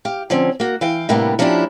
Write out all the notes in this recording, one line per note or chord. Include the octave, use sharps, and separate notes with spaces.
G4 F5
D3 F3 C4 C#4
A#3 F#4
E3 F5 G5
A2 C3 G3 A#3 B3 D4
F3 A#3 C#4 D4 E4 G4